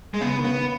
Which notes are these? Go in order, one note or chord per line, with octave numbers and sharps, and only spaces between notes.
G#3
C#3 B3
D#3
C#3 B3